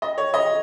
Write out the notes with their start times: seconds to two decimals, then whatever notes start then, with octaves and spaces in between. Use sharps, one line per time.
0.02 D#5
0.18 C#5
0.34 D#5